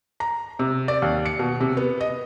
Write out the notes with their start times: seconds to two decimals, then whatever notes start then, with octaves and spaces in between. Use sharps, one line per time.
0.20 A#5
0.59 C3
0.88 D5
1.02 D#2
1.26 C#7
1.39 B2
1.60 C3
1.77 B3
2.01 D#5